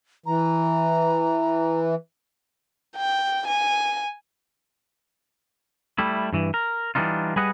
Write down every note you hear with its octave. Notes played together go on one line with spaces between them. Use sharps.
E3 A#5
G5
G#5
G3 A3 E4
G2 E3
A#4
E3 G3 D4 D#4 F4
G3 G#4 B4 D#5 F#5